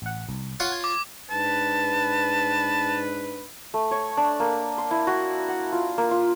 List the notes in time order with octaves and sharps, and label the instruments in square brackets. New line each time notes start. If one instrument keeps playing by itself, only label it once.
[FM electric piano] A1 F#5
C2
[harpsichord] F4 C#5 F5 [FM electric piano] F#5
[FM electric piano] G#6
[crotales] D6
[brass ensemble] G#2 D4 B4 [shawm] A5
[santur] A3
C#5
D4
A#3
C6
E4
F#4
F#5
F4
A#3
F4